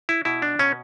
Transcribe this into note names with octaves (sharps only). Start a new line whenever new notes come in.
E4
B2 E4
D4
B2 C#4